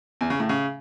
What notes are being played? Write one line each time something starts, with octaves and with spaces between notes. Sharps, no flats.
E2
C#3
A2
C#3